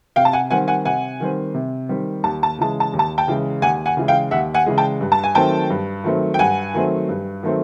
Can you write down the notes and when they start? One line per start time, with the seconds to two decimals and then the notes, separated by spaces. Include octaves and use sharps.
0.16 C3 F5 G5
0.25 A5
0.33 F#5 G#5
0.51 D#3 G3 C4 F#5 G#5
0.68 F#5 G#5
0.85 C3 F#5 G#5
1.20 D#3 G3 C4
1.54 C3
1.89 D#3 G3 C4
2.24 D#2 A5
2.43 A5
2.58 C#3 E3 G#3 A5
2.80 A5
2.93 D#2
2.99 A5
3.18 G5 A5
3.28 C#3 E3 G#3
3.62 D#2 F#5 G#5
3.86 F#5 G#5
3.97 C#3 E3 G#3
4.08 F5 G5
4.31 D#2 E5 F#5
4.54 F#5 G#5
4.66 C#3 E3 G#3
4.78 G5 A5
5.01 G2
5.12 A5
5.24 G#5
5.35 D#3 F#3 A3 C4 G5 A5
5.70 G2
6.04 D#3 F#3 A3 C4
6.34 G5
6.39 G2 F#5 G#5
6.74 D#3 F#3 A3 C4
7.09 G2
7.43 D#3 F#3 A3 C4